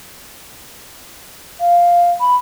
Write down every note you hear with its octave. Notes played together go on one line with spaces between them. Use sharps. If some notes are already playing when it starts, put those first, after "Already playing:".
F5
B5